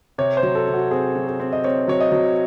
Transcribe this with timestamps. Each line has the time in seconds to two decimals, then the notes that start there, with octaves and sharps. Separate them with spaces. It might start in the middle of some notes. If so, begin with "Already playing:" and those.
0.18 C3 C#5
0.37 C5
0.43 F#3
0.55 A4
0.68 C3
0.73 F#4
0.91 C4 G#4
1.16 F#3
1.28 G#4
1.40 C4
1.53 D#5
1.64 C4 C#5
1.88 F#3 C#5
2.00 D#5
2.12 F#3